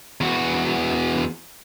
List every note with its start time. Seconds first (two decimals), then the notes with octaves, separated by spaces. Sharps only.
0.21 E2 F#4